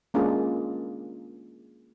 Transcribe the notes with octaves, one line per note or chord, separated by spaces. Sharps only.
G#3 A#3 C#4 D4 F4 G#4